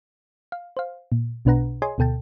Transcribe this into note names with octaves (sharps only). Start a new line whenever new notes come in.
F5
C5 F5
A#2
B1 B2 D4 B4 F#5 A#5
G#4 C#5 D#5 G#5 C6
D2 B2 A4 G5 A5